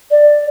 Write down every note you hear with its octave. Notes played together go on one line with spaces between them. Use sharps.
D5